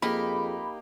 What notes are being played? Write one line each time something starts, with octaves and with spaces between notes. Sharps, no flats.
F2 A#3 D#4 G4 G#4 B5